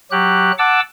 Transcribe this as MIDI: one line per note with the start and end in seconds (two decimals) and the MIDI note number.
0.11 0.52 54
0.11 0.52 67
0.11 0.52 90
0.58 0.80 78
0.58 0.80 81
0.58 0.80 86
0.58 0.80 88